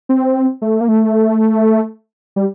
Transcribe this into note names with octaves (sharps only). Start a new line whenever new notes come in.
C4
A3
A#3
A3
G3